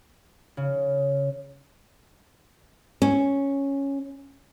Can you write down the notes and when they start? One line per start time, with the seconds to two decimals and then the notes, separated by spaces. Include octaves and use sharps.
0.57 C#3
3.02 C#4